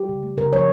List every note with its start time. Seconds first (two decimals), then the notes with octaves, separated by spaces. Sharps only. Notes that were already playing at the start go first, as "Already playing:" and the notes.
Already playing: G3 G4
0.09 C#3
0.23 A3
0.37 C#3 A#4
0.52 F3 C#5